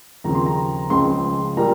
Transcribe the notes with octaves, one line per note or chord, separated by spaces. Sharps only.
D#2 C#3 F3 C4 A#5
C6
A#5
C#2 C#3 F3 G#3 C4 C6
A#2 G3 A#3 A#5